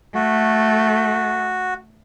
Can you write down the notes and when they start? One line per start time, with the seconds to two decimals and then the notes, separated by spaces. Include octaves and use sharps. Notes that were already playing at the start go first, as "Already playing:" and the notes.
0.15 A3 F#4